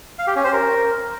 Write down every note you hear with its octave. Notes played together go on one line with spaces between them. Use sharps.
F5
G4
C#4
C5
A#4